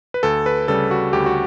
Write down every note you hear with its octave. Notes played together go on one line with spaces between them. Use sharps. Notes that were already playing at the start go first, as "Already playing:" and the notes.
B4
D2 A4
B4
C#3 G3 A4
F#4
D2 G4
F#4